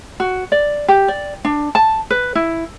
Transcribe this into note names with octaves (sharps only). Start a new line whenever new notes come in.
F#4
D5
G4
D5
D4
A5
B4
E4